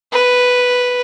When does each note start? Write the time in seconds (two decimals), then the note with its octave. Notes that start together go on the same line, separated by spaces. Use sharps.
0.12 B4